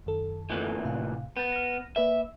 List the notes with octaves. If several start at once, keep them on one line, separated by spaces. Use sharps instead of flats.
F#2 D#3 A4
D2 A#2 E3
A2 C3 F5
B3 G6 A6
F6 A#6
A#3 B4 D5 E5